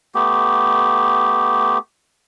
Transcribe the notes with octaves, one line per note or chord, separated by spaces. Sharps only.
A3 B3 G4